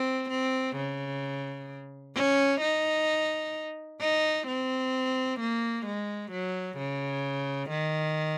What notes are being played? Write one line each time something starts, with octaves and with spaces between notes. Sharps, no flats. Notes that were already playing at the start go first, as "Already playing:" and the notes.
Already playing: C4
C4
C#3
C#4
D#4
D#4
C4
A#3
G#3
F#3
C#3
D#3